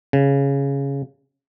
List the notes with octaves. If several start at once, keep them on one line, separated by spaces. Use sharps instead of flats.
C#3